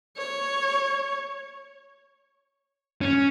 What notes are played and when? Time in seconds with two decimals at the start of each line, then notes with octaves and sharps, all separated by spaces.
0.17 C#5
3.01 C#4